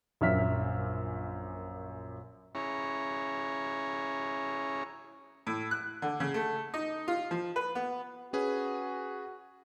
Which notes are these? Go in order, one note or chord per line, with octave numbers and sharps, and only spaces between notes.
A#1 F#2 E5 F6 B6
C#4 E4 G#4 C#5 A#5
A2
F#6
D3
C#3
A3
D#4
F4
F3
B4
B3
C#4 F#4 G#4 B4